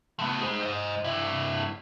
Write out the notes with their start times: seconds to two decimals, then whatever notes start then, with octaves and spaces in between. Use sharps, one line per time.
0.19 A3 B3
0.41 G#4 C5
0.63 C5 D#5
1.04 G2 E4